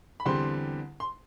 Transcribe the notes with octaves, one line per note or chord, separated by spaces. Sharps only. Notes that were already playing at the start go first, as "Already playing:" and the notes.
B5
E2 D3 G3 C4 C6
C6